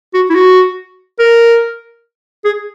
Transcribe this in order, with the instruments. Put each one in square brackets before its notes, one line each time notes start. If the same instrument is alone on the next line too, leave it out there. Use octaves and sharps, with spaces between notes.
[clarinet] F#4
E4
F#4
A#4
G#4